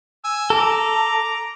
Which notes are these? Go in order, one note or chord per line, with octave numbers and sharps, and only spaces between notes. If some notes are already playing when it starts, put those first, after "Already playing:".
G#5 E6
A4 A#5 D6